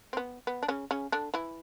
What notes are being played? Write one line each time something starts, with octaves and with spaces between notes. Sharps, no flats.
C4
B3
B3
D4
C#3 C#4
C#3 C#4
D3 D4
E3 E4